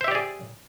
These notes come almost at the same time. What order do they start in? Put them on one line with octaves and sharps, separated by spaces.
C5 E5 G4 D5 G#4